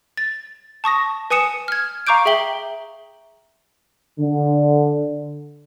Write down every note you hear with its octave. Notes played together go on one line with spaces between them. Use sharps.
A6
A5 C#6 D#6 A#6
B4 G#5 D#6 C#7 E7
F6 G#6
F5 A#5 C#6 D6 G6 D7
G#4 E5 G5 F#7 G7
D3